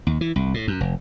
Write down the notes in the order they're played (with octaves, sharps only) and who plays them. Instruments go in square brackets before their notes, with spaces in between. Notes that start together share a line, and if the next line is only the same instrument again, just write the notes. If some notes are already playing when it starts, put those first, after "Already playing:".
[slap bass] D#2
E3
C2
A2
F#2
F1